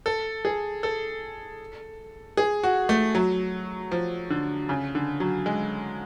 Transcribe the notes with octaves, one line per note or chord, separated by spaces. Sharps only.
A4
G#4
A4
G#4
F#4
A3
F#3
F3
D3
C#3
D3
F#3
G#3